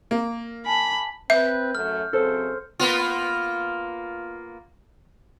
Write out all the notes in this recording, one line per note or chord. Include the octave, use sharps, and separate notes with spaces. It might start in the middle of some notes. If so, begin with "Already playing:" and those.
A#3
G#5 A5 B5
C4 B4 E5 G6
F#2 F#3 A3 F6
F#2 C#3 C4 A4 C5
A#3 B3 F4